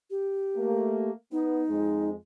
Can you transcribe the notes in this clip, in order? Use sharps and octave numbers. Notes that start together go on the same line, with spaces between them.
G4
A3 A#3
B3 D#4
F2 G#3